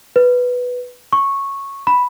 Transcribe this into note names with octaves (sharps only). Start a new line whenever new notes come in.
B4
C#6
B5